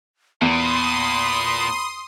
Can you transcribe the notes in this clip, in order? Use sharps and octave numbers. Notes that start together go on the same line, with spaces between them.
E2 A#2 B5 C6 D#6